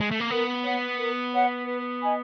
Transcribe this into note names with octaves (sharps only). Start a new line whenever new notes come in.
G#3
A3
A#3
B3 A#4
C#5 F#5
A#4
C#5 F#5
B4
D#5 G#5 B5